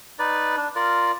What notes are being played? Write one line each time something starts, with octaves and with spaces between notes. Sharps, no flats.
D#4 B4 D5
D4
F4 A#4 D5